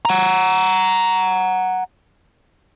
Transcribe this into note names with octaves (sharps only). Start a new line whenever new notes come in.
F#5 A#5